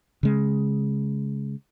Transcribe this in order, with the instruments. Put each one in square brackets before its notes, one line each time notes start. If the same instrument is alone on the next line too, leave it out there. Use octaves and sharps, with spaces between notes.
[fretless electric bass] C#3 G#3